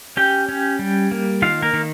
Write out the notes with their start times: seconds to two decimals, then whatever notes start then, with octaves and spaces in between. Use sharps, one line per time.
0.17 C#4 G4 G5
0.49 C#4
0.79 G3
1.11 A#3
1.42 D#3 F4 F5
1.62 A#3 A#4
1.73 D#3